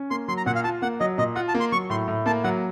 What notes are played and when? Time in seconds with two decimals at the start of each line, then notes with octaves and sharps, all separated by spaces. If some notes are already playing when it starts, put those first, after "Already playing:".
Already playing: C#4
0.10 A#3 C6
0.28 F#3 C6
0.37 A#5
0.46 A#2 F#5
0.55 F5
0.64 F4 A5
0.82 A#3 F#5
1.00 F#3 D#5
1.18 A#2 D#5
1.36 F4 F#5
1.48 A5
1.55 A#3
1.60 C6
1.72 F#3 C#6
1.90 A2 C6
2.08 A2
2.26 A#3 A5
2.44 F#3 F#5